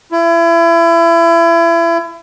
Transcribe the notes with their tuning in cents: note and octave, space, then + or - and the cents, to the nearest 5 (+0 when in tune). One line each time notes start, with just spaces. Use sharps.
E4 +30